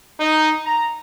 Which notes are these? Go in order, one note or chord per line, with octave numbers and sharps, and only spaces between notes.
D#4
A#5